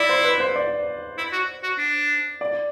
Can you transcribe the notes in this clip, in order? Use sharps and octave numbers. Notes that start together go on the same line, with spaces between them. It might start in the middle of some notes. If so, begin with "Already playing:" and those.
Already playing: E4 D5
C5
B4
C5
D5
E4
F#4
F#4
D4
D5